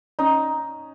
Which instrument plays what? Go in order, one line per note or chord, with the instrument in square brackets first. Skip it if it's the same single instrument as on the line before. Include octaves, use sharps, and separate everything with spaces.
[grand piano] C#4 [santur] D#4